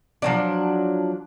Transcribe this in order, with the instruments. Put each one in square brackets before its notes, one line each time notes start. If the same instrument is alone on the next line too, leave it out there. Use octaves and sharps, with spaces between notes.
[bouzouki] F3 F#3 D4